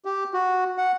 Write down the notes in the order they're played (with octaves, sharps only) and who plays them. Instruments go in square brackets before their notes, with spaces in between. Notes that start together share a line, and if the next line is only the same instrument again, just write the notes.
[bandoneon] G4
F#4
F#5